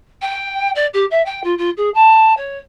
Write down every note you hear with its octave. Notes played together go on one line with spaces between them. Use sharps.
G5
D5
G4
E5
G5
F4
F4
G#4
A5
C#5